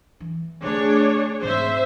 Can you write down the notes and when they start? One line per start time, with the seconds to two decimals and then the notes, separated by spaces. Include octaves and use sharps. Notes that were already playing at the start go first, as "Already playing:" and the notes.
0.20 E3
0.62 D3 A3 D4 G#4 C#5
1.42 G#2 C4 C5 E5